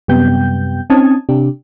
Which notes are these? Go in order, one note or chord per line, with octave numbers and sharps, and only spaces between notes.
F#2 C3 G3 B3 G5 G6
C4 C#4 D#4 A5 D#6 G#6
C3 D4 G4